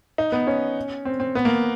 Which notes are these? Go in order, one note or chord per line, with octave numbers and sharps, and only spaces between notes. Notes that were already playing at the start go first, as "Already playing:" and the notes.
D#4
B3
C#4
C4
C4
B3
A#3